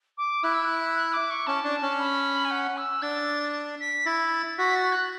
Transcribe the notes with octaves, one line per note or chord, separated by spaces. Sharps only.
D6
E4 F#6
E6
F#6
F#6
D6
C#6
C#4 A5
D4
C#4
B5
G#5
F#5
E6
D4 A6
B6
E4 A6
A6
F#4 B6
A6
F#6